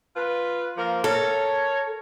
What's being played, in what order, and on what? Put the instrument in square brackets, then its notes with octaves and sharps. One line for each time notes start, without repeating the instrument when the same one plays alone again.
[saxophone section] F4 B4
F3 A#3 A#4
[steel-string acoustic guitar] A4 [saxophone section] A#4 C#5